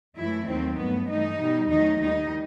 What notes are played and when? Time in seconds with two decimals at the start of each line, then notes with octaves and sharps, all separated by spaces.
0.17 F#2 E3 A3 E4
0.47 D#2 D#3 F#3 A3 C4
0.77 G2 F#3 A3 B3
1.08 G2 E3 A3 D#4
1.39 B2 G3
1.69 E2 D#3 F#3 A3 D#4
2.00 D#2 D#3 G3 D#4